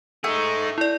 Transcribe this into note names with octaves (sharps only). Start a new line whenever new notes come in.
A3 D#4 G#4
E4 D5